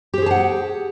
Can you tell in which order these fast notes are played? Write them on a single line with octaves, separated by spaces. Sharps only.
G4 C5 G#4 A5 F#5